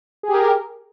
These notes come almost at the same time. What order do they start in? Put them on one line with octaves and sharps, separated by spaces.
G#4 G4 A#4